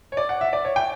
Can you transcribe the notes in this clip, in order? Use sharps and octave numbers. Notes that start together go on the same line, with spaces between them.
C#5
D5
F#5
E5
D5
C#5
G5